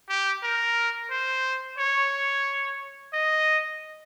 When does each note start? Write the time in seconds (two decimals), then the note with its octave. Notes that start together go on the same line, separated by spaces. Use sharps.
0.09 G4
0.43 A#4
1.11 C5
1.78 C#5
3.13 D#5